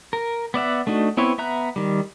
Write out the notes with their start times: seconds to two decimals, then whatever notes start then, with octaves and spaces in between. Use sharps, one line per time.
0.13 A#4
0.54 B3 D5 E5 F#5
0.87 A3 D4 D#4 F#4
1.17 B3 C4 E4 B4 C#5
1.38 B3 E5 A#5 F#6
1.76 D#3 G3